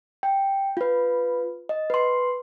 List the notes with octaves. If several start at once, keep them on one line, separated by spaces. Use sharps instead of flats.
G5
F4 B4
D#5
B4 C6